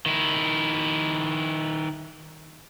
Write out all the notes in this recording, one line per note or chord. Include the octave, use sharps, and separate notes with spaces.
D#3 E4